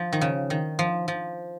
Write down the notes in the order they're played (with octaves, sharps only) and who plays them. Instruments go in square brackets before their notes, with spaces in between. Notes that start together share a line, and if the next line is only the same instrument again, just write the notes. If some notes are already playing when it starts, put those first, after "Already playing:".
Already playing: [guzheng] F3
D#3
C#3
D#3
F3
F3